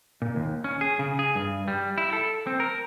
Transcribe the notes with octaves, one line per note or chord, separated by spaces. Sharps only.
A#2
D#2
C#4
G#4
C#3
G#4
G2
G3
E4
A4
C4
A#4